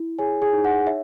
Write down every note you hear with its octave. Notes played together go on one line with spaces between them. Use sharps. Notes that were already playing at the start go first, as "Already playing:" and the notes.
Already playing: E4
G#4 C#5 G#5
G#4 G#5
D#4
F#5
C#5 E5